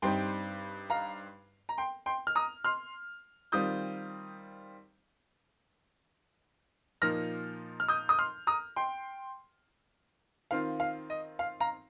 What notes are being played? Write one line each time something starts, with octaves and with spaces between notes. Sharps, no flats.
G2 G3 C4 D#4 G5 C6
F5 A#5
A#5
G5 C6
G5 C6
F6
A#5 D#6
C6 F6
D#3 G3 C4 F4 D#6 G6
A#2 F3 A#3 D#4 F6 A#6
F6
D#6 G6
D#6
C6 F6
A#5 D#6
G5 C6
D#3 C4 F4 F5
F5
D#5
F5
F5 A#5